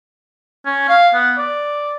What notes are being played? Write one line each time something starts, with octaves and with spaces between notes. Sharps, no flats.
C#4
F5
B3
D5